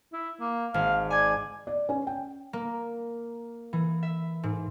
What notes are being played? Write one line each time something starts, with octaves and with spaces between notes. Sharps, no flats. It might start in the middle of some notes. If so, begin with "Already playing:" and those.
E4
A#3
G#1 F5
D5 G#5 G#6
D5
C#4
G5
A#3
E3
E5
G#2